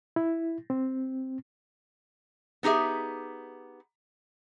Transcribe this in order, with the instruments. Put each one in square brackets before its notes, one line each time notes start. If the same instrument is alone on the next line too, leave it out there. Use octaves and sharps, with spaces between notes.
[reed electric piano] E4
C4
[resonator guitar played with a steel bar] B3 D#4 G4 G#4 E5